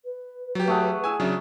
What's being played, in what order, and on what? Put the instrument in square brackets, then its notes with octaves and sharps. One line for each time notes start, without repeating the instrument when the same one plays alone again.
[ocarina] B4
[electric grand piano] F#3 G4
[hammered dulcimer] A3 G#4 F#5
[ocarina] E4 [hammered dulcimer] G#4 [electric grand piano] G#5 E6
[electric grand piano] C#3 F#3 D4 [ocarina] E5